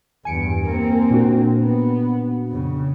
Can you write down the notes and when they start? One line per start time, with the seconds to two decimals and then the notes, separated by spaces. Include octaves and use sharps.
0.25 E2 G2 G#5 C#7 D7
0.66 A#3 C4
1.10 A#2 D4 F#4
1.59 B3
2.48 F2 C#3